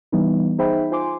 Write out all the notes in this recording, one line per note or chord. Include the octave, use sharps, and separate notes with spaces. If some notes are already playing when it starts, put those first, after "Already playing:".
E3 G3 B3 D#4
D#4 G#4 C5 E5 G5 B5
F4 C5 G#5 C6 D6